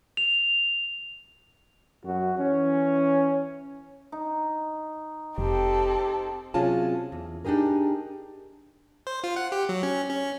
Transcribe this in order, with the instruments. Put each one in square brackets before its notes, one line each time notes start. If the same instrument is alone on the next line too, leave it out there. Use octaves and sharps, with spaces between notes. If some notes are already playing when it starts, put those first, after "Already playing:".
[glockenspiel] F7
[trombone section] F#2 F#4
E3 C#4
[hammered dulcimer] D#4
[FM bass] F1 [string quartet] C4 A4 [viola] G4
[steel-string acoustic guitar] C3 F#3 C#4 F4 G#4 A5
E2
D4 D#4 G4 G#4 A#4
[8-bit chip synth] C5
F4
F#5
G4
F#3
C#4
C#4